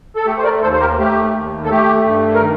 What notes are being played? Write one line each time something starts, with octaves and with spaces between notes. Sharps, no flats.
A4
A3 G4
C5
A#4 D5
D#2 A4 C5
C5
G4 A#4
A3 G4
D#2
A4
A3 G4
G2
A#4
D#3